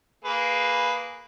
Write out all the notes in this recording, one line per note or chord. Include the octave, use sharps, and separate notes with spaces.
A#3 G#4 B4